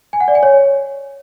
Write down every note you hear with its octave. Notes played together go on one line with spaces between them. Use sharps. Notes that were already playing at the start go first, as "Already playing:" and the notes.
G#5
F#5
D5
G#5
C#5